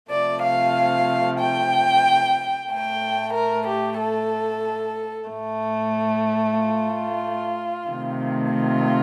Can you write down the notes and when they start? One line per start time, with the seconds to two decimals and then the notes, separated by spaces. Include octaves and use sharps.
0.10 C3 F3 A3 D5
0.42 F5
1.39 G5
2.70 A2 A3 G5
3.34 A#4
3.67 G4
4.00 A4
5.29 A2 A3
6.58 F4
7.89 C3 D#3 A3
8.53 F4